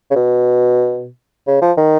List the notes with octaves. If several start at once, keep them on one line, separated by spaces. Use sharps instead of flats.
C#3
B2
C#3
F3
D#3